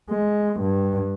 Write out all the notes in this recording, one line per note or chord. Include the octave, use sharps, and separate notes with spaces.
G#3
G2